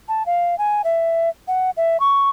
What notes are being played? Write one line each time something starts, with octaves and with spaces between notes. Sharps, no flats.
A5
F5
G#5
E5
F#5
E5
C#6